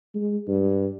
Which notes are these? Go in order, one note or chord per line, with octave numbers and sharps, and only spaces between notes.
G#3
G2